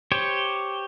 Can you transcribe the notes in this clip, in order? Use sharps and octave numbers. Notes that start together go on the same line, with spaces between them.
G4 C5 C#5